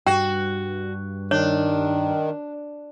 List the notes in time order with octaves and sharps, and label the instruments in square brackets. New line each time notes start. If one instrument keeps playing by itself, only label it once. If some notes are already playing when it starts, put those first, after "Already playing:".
[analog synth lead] G2 [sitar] F#4 [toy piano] G5
[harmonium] D#3 [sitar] D4 [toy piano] C#5